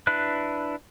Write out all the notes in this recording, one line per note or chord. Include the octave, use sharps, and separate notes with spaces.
D4 E4 B4 F#6